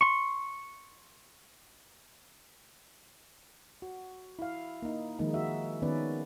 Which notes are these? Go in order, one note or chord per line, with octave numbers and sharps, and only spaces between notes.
C6 C#6
F#4
E4 F5
A#3 D#4
D#3 F3 G#3 A#3 D#4
F#4 E5
D#3 B3 C#4 B4 D5